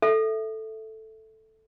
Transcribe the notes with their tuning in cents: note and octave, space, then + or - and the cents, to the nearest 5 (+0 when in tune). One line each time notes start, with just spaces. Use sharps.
A4 +0 E5 +0